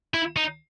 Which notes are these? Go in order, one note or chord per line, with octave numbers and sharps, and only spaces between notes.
E4
D#4